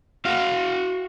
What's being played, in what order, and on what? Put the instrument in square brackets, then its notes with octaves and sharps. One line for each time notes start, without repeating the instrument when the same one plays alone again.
[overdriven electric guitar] F#4 F5